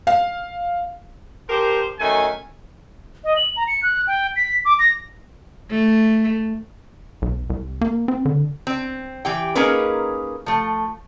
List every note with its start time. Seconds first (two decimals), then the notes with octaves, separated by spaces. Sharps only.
0.07 F5
1.49 F3 G4 A#4 C5
2.00 F#2 D#3 A3 G#5
3.24 D#5
3.37 F#7
3.56 A#5
3.68 C#7
3.83 F#6
4.07 G5
4.36 B6
4.65 D6
4.79 A#6
5.71 A3
7.22 B1
7.50 C2
7.81 A#3
8.08 C4
8.25 D3
8.67 C4
9.25 E3 G4 G5
9.55 A#3 C#4 D#4 G#4 A#4 B4
10.46 F3 A3